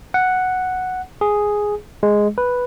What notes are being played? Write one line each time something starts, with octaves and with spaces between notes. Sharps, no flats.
F#5
G#4
G#3
B4